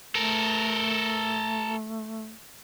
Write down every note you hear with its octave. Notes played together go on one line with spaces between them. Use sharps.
A3 A4 A#4